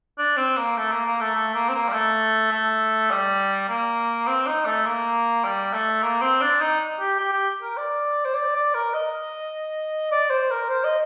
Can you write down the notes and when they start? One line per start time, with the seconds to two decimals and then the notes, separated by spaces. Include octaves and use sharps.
0.18 D4
0.37 C4
0.57 A#3
0.77 A3
0.91 A#3
1.05 A#3
1.21 A3
1.35 A3
1.54 A#3
1.69 C4
1.74 A#3
1.89 G3
1.93 A3
2.51 A3
3.11 G3
3.69 A#3
4.27 C4
4.47 D#4
4.66 A3
4.86 A#3
5.44 G3
5.73 A3
6.02 A#3
6.22 C4
6.41 D4
6.61 D#4
7.00 G4
7.19 G4
7.33 G4
7.62 A#4
7.77 D5
8.25 C5
8.35 D5
8.56 D5
8.74 A#4
8.94 D#5
10.12 D5
10.30 C5
10.50 A#4
10.69 C5
10.84 D#5